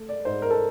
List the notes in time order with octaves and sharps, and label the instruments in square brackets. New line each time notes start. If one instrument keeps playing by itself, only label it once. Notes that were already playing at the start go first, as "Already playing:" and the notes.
Already playing: [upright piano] A3
D5
G#2 C5
A#4
A4